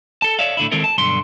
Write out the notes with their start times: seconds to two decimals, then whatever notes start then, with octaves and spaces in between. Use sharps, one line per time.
0.22 A4 A5
0.39 C#5 D5 E5 F5
0.57 A2 D3 E4
0.71 D#3 G#3 C4 E4 A4 A#4
0.84 A5
0.98 B1 G2 D3 C6